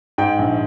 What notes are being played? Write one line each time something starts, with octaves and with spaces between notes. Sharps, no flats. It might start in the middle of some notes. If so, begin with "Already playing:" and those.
G#2 G5
A#1